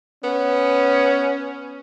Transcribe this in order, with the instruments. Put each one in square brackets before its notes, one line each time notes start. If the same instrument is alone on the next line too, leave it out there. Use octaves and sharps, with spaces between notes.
[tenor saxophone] B3 [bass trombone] C#4